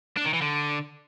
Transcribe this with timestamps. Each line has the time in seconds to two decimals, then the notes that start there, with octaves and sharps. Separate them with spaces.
0.17 D4
0.25 D#3
0.33 E3
0.42 D3